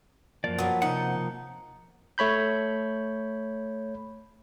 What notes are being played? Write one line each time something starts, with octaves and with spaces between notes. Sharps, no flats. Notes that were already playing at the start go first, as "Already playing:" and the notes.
F#2 F3 A#3 D5
F#3 B3
C3 D#4 F#5
A3 C#5 B5 G6